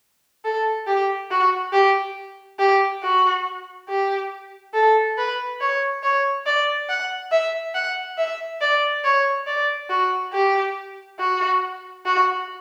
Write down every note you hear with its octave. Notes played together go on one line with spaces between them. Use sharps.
A4
G4
F#4
G4
G4
F#4
G4
A4
B4
C#5
C#5
D5
F#5
E5
F#5
E5
D5
C#5
D5
F#4
G4
F#4
F#4